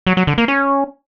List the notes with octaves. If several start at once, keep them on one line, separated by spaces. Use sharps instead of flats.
F#3
F#3
D3
A#3
C#4